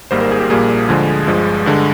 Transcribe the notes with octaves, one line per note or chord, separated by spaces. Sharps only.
G#1 G#2 G3 A#3 C5
A#4
G#4
G4
A#1 A#2 G3 A#3 G#4
D2 D3 F3 G#3
G1 G2 F3 G#3
G2 D3 G#3